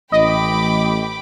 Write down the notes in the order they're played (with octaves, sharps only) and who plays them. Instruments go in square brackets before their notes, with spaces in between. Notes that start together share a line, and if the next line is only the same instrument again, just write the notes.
[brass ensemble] A1 [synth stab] D#5 [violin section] G5 B5 D6